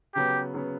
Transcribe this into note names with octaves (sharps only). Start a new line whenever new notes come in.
C#3 F#3 B3 G4
C#3 F#3 B3